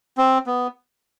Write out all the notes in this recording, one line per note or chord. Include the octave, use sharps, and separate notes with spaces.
C4
B3